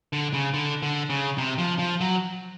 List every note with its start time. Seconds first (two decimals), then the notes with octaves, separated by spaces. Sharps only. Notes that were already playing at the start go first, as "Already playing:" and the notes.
0.13 D3
0.33 C#3
0.54 D3
0.83 D3
1.10 C#3
1.38 C3
1.58 F3
1.79 F3
2.01 F#3